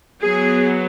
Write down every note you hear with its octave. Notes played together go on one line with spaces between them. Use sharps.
F#3 B3 G#4